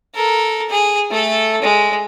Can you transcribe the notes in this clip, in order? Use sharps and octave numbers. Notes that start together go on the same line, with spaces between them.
A4 A#4
G#4
A3 A4
G#3